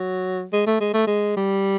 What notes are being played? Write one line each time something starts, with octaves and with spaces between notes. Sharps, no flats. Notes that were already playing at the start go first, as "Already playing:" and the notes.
Already playing: F#3
G#3
A3
G#3
A3
G#3
G3